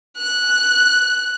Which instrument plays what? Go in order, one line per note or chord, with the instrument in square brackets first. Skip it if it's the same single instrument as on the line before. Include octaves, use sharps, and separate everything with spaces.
[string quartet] F#6